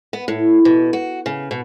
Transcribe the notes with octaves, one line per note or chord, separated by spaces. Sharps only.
B3
A2
B2
F#4
C#3
B2